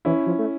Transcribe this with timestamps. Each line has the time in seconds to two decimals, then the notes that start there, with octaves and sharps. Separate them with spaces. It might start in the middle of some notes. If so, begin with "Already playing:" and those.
0.05 E3 C#4 E4
0.26 F3
0.39 A3